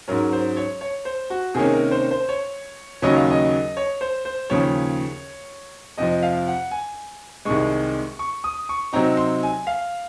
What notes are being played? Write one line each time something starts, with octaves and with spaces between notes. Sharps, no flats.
G#2 F#3 C#4 A#4
C5
C#5
C#5
C5
F#4
C3 D#3 A#3 C#4 G#4
A#4
C5
C5
C#5
D#2 C#3 F#3 C#4 D#5
F5
D#5
C#5
C5
C5
D#2 C#3 F3 C#5
F2 C3 F3 D#5
F5
F#5
G#5
C2 C3 D#3 G#3 C#6
C#6
D#6
C#6
C3 F#3 C4 D#4 A#5
C6
G#5
F5